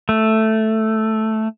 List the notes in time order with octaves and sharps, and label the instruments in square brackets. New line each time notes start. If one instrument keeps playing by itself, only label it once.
[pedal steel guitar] A3